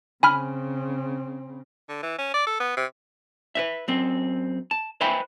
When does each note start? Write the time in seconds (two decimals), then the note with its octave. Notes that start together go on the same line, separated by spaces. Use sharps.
0.23 C#3 C4 G#5 B5 F6
1.89 D3
2.03 E3
2.18 C#4
2.34 D5
2.47 A4
2.60 B3
2.77 C3
3.55 B4 C5 E5
3.88 F#2 C4
4.71 A5
5.01 B4 C5 E5 G5 G#5 B5